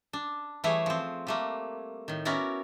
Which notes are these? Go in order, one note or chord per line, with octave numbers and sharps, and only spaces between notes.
D4
E3 G3 A3 E4 G#4 C#5
F3 C4
G3 A3 A#3
A2 D#3
B3 C#4 E4 F#4 A#4 D5